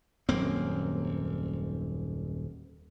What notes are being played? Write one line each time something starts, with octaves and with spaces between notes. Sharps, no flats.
D#1 F#2 A#3 C4